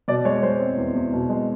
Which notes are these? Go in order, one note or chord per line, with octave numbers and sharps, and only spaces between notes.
B2 D5
G#3 C#5
G#3 C5
C4
E2
E2
B2
G#3